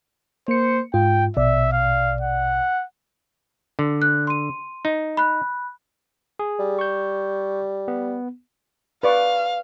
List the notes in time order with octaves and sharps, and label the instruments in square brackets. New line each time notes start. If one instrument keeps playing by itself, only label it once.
[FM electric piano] A#3 C#7 [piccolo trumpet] C5
[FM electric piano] G#2 F4 [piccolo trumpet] G5
[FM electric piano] A#1 B2 D5 [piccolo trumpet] E5
[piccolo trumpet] F5
F#5
[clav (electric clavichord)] D3
[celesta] F#6
C6 D#7
[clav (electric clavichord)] D#4
[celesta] B5 F#6
[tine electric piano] G#4
[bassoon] G3
[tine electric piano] C#6 G6
B3
[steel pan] B4 D5 C#6 [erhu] F5